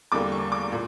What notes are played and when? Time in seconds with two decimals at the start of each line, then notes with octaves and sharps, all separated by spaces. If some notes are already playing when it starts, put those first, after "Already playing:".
0.12 E2 D3 G3 A#3 D6
0.32 C#6
0.52 D6
0.72 A#2